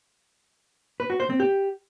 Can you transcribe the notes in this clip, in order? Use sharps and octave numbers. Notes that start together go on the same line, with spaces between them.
B4
F#4
C5
C4
G4